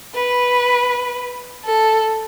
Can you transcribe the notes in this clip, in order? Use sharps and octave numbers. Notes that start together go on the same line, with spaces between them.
B4
A4